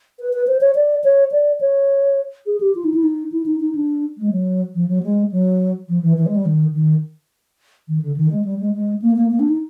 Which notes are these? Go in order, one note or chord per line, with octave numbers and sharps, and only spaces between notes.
B4
B4
C5
C#5
D5
C#5
D5
C#5
G#4
G4
F4
D#4
E4
D#4
E4
D#4
D#4
D4
G#3
F#3
F3
F#3
G#3
F#3
F3
E3
E3
G#3
G3
D#3
D#3
D#3
D3
D#3
G#3
G3
G#3
G#3
A#3
A#3
A#3
D4
D#4